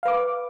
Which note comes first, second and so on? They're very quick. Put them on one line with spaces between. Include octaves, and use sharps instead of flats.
F5 B4 D6